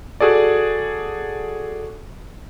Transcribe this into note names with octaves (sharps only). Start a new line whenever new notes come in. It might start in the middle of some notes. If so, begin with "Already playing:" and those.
F#4 G#4 A4 D5